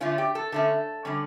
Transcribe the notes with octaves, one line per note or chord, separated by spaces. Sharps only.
D3 A3 C#4 F4
G4
A4
D3 A3 C#4 A4
D3 G3 C#4